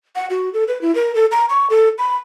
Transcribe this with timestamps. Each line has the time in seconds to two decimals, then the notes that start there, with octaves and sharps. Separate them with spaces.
0.16 F#5
0.30 F#4
0.53 A4
0.68 B4
0.81 E4
0.95 A#4
1.15 A4
1.32 A#5
1.50 C#6
1.70 A4
1.98 B5